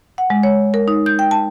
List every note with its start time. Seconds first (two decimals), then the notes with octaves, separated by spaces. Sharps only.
0.18 F#5
0.30 G#3
0.43 C#5
0.74 A#4
0.88 D#4
1.06 G6
1.19 G5
1.31 A5